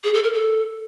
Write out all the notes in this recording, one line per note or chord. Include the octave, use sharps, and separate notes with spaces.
G#4
A4
A#4
A4